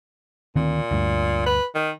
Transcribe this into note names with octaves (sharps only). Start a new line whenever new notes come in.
D2 A#2 D#3 C4
D2 G2
B4
D#3